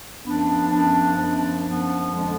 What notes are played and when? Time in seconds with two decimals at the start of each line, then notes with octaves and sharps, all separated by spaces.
0.23 F#2 F3 B3 D4
0.70 F#2 F3 B3 D4
1.17 F#2 F3 B3 D4
1.65 F#2 F3 B3 D4
2.12 F2 D3 F3 G#3 D4